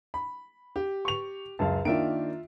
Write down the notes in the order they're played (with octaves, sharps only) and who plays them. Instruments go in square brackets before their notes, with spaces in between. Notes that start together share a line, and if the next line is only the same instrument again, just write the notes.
[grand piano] B5
G4
[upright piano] C#6 F7
[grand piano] C#2 F#2 [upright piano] F5 A5
[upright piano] D#3 A#3 D4 [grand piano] F4 E5 D7